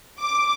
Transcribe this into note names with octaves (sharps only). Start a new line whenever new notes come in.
D6